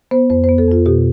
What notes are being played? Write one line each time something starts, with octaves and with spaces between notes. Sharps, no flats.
B3 C5
F2 C5
C5
B3
A4
F2 F4
B2 G4